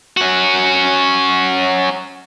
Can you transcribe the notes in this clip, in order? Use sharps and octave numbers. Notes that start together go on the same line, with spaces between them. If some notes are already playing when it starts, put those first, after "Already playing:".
C#4 F#4